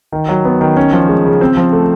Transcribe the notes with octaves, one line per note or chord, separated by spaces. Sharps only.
D#3
F#3
B3
D#3
C#4
F3
G#3
C#3
C4
F3
A3